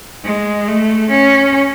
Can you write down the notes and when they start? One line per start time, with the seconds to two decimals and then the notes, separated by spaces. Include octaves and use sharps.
0.24 G#3
0.67 A3
1.09 C#4